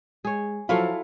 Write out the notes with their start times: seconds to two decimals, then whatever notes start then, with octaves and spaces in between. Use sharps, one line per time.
0.25 G#3 G#4 C#5
0.69 F3 F#3 E4 F4 A4 C#5 F5